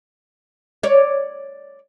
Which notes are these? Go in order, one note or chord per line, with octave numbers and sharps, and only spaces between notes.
C#5 D5